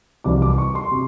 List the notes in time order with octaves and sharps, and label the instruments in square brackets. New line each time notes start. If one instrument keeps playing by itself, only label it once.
[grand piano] C2 C3 E3 D6
D6
C#6
C6
C3